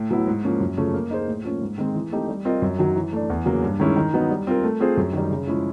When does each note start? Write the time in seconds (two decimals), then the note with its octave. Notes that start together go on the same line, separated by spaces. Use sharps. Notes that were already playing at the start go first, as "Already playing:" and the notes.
Already playing: A2
0.10 F#3 B3 E4
0.27 G#2
0.44 F3 A#3 C#4
0.60 F#2
0.77 C#3 F3 A3 C#4
0.94 A#3
1.10 D#4 G#4 C5
1.28 A2
1.44 F3 A#3 C#4
1.61 G#2
1.78 D#3 G#3 C4
1.95 E3
2.12 A3 C4 D#4 G4
2.28 G3
2.45 C4 F4 A#4 D#5
2.62 F#2
2.79 D#3 F#3
2.95 E3
3.12 A3 D4
3.30 E2
3.46 C#3 F#3 A#3
3.63 G2
3.80 D#3 G#3 C#4 E4
3.96 D#3
4.13 F#3 B3 D#4
4.30 G3
4.47 C4 F4 A#4
4.63 A3
4.80 C4 F4 G#4 C5
4.97 F#2
5.13 D#3 G3
5.31 C#3
5.47 F3 G#3 C#4 E4